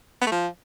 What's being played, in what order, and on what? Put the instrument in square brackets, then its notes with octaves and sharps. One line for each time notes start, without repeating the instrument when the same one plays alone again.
[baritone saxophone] B3
A3
F3